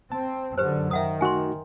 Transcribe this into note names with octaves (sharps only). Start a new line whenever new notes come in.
C4 A5
F#2 D3 G4 B4 C5
D#3 E5 F#5 D#6
A3 D#4 F#4 G#5 C6